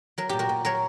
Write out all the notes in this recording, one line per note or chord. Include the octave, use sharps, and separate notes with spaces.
F#3 A#4
A#2 G4
F#4 A#4
A#2
F#3 A#4 C#5